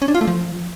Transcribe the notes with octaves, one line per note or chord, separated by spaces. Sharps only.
C#4
D4
F4
A3
F3